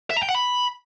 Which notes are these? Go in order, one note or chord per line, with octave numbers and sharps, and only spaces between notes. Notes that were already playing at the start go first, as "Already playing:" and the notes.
E5
A#5
G5
F#5
B5